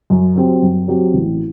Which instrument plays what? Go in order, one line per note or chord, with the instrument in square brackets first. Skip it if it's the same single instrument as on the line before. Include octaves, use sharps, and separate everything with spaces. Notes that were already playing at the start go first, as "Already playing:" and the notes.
[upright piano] F#2
F#3 C4 G4
F#2
F#3 C4 G4
A1